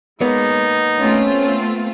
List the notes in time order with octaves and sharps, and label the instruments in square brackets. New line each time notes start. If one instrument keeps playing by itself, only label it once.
[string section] G#3 [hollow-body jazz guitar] A#3 B3 C#5 [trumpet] D#4
[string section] A3 C4 F4 [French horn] C#4